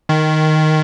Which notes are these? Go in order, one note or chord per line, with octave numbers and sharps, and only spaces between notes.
D#3